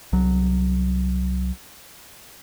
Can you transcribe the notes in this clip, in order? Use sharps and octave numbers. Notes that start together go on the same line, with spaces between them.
C2 F#3